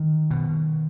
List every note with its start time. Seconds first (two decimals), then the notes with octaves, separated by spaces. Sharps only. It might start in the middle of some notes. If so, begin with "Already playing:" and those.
Already playing: D#3
0.31 B2